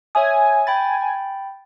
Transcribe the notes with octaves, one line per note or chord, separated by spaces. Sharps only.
C#5 E5 G#5 D#6
G5 B5 A6